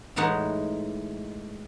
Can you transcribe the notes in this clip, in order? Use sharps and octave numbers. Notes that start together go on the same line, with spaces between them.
A2 E3 G#3 D#4 F#5